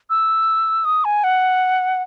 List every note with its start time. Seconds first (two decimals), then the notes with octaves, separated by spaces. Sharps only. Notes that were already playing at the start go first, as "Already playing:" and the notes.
0.10 E6
0.85 D#6
1.05 G#5
1.24 F#5